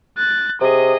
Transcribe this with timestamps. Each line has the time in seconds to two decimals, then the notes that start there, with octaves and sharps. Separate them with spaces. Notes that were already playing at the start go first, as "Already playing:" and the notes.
0.17 F#6 A6
0.61 C3 G#4 D#5